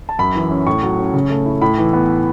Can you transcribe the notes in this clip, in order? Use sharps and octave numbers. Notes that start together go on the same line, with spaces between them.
A5
F#2 B5
E3
C#4
A2 C#6
F#3
C#4
C#3
A3
E4
A2 B5
E3
B3